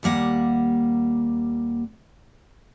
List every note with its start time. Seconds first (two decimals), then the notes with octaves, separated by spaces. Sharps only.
0.03 D#2 G3 A#3 F#5